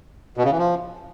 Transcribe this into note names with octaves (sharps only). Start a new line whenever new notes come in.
B2
C#3
E3
F3